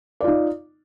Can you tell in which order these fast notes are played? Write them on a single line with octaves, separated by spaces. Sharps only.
D5 F4 D#4